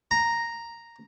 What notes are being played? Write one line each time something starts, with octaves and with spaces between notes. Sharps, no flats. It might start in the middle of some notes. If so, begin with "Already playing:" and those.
A#5